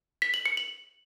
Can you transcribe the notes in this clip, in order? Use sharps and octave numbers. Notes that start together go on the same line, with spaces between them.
B6
F#7
C#7
F#7